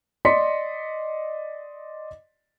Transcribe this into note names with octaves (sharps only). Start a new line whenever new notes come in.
D5 D#5 C6 B6 C#7